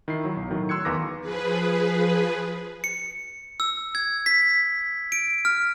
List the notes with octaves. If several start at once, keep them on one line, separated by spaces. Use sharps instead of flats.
D#3 E4 C7
F#3
B1
A2 D#3 F#3
C6 E6 F#6 G#6 C#7
E2 D#3 B4 F5 D6 A#6
F3 G#4 B4
C#7
E6
G#6
B6
D7
F6